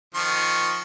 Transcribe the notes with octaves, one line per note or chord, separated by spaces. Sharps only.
D#3 F3 C#6